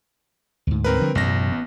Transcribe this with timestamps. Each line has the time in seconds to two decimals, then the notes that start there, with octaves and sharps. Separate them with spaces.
0.67 D2 G#2
0.84 C4 A#4 B4
1.01 D3 F3 G3
1.15 A1 F#2 B2 A#6
1.52 B3